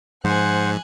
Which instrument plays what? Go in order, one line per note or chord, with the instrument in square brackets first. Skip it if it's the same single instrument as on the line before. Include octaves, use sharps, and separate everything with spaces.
[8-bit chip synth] G#2 [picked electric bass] F3 [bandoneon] C5 F#5 [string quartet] G#5 F#6